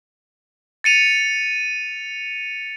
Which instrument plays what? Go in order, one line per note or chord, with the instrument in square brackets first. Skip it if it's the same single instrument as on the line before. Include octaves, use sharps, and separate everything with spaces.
[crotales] A6 C#7 D#7 F7